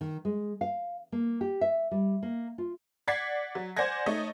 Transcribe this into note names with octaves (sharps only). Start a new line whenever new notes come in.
D#3
G#3
F5
A#3
G4
E5
G3
A#3
F4
D5 F#5 G#6 A6 B6 C7
F#3
C5 D5 F#5 G#5 G#6 A#6
A3 D#4 C#5 D#5